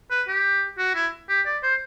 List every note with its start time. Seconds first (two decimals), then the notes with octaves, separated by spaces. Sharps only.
0.11 B4
0.28 G4
0.78 F#4
0.95 E4
1.29 G4
1.45 D5
1.63 C5